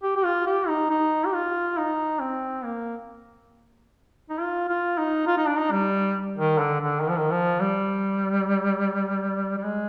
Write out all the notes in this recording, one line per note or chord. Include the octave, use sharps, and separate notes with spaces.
G4
G4
F4
G4
D#4
D#4
G4
F4
D#4
C4
A#3
D#4
F4
F4
D#4
F4
D#4
D4
D#4
G3
D#3
D3
D3
D#3
F3
D#3
F3
G3
G3
G#3